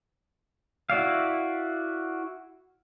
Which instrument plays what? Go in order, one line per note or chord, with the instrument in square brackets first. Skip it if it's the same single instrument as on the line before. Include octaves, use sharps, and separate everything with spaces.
[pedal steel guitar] E4 F#4 D5 F5